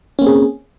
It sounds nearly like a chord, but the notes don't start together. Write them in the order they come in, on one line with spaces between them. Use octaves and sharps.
C#4 A#3 C4 G#4